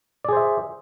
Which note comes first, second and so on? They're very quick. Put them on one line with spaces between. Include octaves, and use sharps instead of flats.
D5 G#4 C5 E5